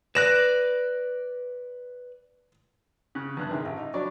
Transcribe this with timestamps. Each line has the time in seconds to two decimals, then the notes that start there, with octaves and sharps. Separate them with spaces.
0.15 B4 D5 F#6 A#6 E7
3.15 C#3 F#6
3.37 E2 G2 F#6
3.51 C3 D#3 G#4
3.65 A1
3.77 D#4
3.94 F#3 D4 C#5 D5 B5 C#6